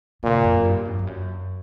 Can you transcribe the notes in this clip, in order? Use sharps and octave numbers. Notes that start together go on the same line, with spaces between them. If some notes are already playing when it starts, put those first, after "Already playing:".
A#2 C#3
G2
F2
F#2
G2
F#2
F2
F#2